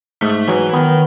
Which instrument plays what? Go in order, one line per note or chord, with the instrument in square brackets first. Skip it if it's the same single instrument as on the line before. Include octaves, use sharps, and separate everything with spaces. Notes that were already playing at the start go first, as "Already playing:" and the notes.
[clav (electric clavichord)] G#2 [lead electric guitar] A3
[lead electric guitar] E3 [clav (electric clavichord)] F#3
[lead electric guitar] D#3 [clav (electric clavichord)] B3